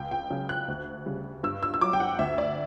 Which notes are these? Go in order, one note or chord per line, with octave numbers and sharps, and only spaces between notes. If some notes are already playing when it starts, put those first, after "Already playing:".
Already playing: C#2 G5
G5
C#3 F#3
F#6
D2
C#3 G3
G2 E6
E6
E6
F#3 D6
G5
F#5
D2 E5
D5